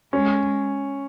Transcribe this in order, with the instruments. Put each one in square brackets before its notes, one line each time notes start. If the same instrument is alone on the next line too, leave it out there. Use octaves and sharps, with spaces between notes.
[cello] G#3 [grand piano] C#4